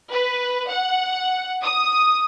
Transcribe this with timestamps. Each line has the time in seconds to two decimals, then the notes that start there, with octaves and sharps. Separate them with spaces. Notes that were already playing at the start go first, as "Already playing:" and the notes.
0.12 B4
0.69 F#5
1.63 D#6